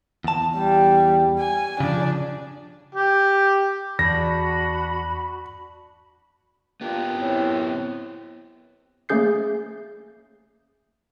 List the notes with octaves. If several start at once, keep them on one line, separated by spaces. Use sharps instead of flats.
E2 A5
G3
G#5
C#3 F3 D4
G4
E2 D4 F#4 B5 A#6
A#3 B3 D4 F4 G4
F#2 A2 C4
A3 A#3 C#4 G#4 G6 C7